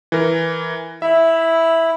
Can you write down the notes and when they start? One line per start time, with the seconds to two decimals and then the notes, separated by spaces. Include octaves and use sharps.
0.12 E3 A#4
1.02 E4 E5